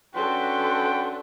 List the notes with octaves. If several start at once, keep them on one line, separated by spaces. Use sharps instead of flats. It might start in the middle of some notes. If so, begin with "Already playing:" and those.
C#4 D4 F#4 A4 B4 G5 C6